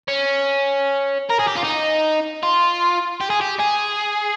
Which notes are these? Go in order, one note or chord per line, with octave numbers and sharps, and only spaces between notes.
C#4
A#4
G#4
G4
F4
D#4
F4
G4
G#4
G4
G#4